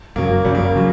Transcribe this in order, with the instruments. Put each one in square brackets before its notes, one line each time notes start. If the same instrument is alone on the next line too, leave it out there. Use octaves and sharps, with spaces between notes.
[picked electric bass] F#2 C#3 F#3 [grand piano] A#3
[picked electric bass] F#2 C#3 F#3 [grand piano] G3
[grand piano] A#3
G3
[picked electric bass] C#3 F#3